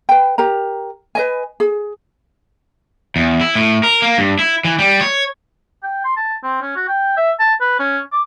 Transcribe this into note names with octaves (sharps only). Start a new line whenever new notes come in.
B4 G5
G4 A#4 A#5
B4 D#5 G#5
G#4
E2
E4
A2
A#4
A#3
G2
E4
E3
G3
C#5
G5
C6
A5
C4
C#4
F#4
G5
E5
A5
B4
C#4
D6